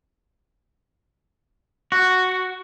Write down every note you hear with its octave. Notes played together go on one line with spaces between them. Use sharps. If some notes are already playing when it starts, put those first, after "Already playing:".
F#4